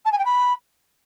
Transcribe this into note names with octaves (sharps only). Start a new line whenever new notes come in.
A5
G#5
G5
B5